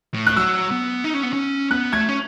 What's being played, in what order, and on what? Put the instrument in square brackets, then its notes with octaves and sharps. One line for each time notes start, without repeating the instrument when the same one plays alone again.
[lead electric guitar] A2
[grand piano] F#6
[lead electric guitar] F#3 [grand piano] E6
[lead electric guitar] B3
D#4
C#4
B3
C#4
[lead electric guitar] B3 [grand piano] F#6
[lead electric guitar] A3 [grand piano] G#6
[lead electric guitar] C#4